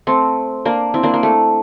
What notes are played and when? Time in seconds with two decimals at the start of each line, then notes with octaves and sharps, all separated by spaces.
0.07 A3 C4
0.65 A#3 D4
0.94 C4 E4
1.03 A#3 D4
1.14 A#3
1.23 A3